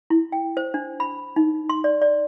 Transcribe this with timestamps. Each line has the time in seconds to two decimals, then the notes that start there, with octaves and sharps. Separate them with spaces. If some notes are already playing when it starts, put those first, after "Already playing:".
0.10 E4
0.32 G5
0.57 C5
0.74 D4
1.00 B5
1.36 D#4
1.69 C6
1.84 D5
2.02 D5